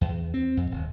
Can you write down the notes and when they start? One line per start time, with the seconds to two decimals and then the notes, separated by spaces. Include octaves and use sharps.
0.01 E2
0.34 C4
0.57 F2
0.71 D#1